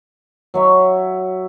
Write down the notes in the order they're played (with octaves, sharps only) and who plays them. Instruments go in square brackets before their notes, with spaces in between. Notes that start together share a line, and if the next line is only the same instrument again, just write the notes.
[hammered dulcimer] F#3 C#5 E5